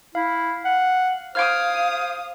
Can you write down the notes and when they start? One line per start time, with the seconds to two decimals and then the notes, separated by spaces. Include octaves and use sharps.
0.15 E4 F5
0.65 F#5
1.35 C5 F5 D#6 F6 G#6 D7